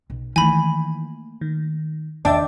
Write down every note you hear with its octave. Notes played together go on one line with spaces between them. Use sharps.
B1
D#3 E3 A3 A#3 G#5 B5
D#3
E2 D#3 D4 E5 G5 A5